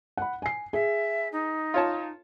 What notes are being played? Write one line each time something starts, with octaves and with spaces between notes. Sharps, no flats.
F#5 B5
G#5 C7
G#4 E5
D#4
F4 C#5 A5